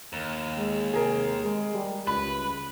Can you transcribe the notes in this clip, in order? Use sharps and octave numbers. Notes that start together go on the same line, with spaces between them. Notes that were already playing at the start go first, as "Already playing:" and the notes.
D#2
G#3
C3 G#4 A#4
G#3
G3
C#2 B4 B5